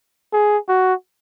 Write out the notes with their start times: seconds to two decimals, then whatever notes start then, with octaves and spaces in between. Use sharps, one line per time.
0.33 G#4
0.69 F#4